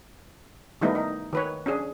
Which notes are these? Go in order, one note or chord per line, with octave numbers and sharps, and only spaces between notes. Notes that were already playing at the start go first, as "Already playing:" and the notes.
D#3 G3 A3 B3 D#4 E4
D#4
D#3 B4 C#5
C#4 D4 G#4